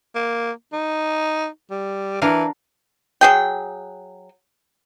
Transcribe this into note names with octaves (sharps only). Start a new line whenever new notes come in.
A#3
D#4
G3
E3 D4 A#4 F5
F#3 G#4 G5